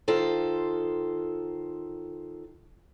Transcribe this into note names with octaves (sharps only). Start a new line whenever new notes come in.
D#3 F4 A4 C5